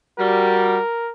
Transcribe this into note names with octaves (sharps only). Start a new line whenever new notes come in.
G3 F#4 A#4